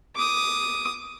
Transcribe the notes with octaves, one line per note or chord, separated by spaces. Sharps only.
D6 D#6